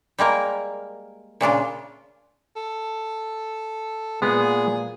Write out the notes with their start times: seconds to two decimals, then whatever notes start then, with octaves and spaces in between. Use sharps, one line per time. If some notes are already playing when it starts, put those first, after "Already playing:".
0.18 G3 G#3 A#3 A#4
1.41 A#2 C#3 D4 F4
2.56 A4
4.22 A#2 G#3 B3 G#4